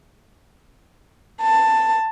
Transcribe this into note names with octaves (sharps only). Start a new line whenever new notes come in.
A5